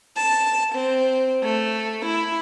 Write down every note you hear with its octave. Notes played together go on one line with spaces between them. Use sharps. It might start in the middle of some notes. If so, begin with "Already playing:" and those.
A5
C4
A3
E4